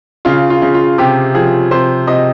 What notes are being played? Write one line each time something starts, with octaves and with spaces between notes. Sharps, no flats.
C#3 F4
F4
C#3
F4
C3 G4
F3 G#4
C3 C5
C3 D#5